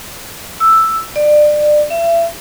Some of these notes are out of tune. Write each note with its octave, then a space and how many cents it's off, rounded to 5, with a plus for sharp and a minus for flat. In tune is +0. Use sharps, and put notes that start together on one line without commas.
E6 +0
D5 +25
E5 +35